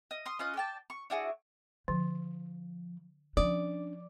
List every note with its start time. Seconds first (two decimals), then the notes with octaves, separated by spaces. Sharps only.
0.11 D#5
0.26 C6 D#6
0.39 C#4 F4 D#5 F#6
0.56 D5 G5 A5
0.90 C#6
1.10 D4 E4 F#4 G#4
1.88 D3 F3
3.37 F3 C#4 D4 D5